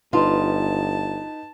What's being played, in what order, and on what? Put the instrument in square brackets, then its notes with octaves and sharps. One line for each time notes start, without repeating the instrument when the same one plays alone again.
[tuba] G1 [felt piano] D#4 B4 [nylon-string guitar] F4 [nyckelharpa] A5